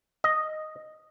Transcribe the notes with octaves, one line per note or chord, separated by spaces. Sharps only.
D#5